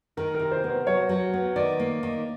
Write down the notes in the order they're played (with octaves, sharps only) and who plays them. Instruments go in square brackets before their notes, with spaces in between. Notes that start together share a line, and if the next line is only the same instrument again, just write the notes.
[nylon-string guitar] D#3 [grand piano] A#4
[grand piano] A#4
[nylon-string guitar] C3
[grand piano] C5
[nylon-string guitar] B3 [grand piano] C5
[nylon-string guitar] F#3 [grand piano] C#5
[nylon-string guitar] F#3
B3
[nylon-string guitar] D#3 [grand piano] D5
[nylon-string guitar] A#3
D#3